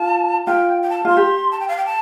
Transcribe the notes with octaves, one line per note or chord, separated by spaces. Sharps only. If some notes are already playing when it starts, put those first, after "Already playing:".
Already playing: F4 A5
F4 G5
G5
A5
F4 C6
G4
A5
G5
F5
G5
A5